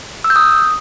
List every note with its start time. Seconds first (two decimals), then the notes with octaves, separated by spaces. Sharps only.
0.24 E6
0.30 G6
0.36 D#6